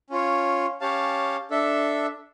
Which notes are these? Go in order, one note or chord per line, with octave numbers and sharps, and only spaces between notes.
C#4 F4 C#5
C#4 G4 C#5 F5 A5
D4 A4 E5